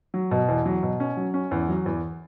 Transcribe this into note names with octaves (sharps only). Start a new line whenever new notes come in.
F#3
B2
E2
F#3
B2
C#4
F#3
C#4
E2
F#3
E2